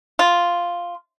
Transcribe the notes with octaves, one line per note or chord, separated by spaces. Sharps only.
F4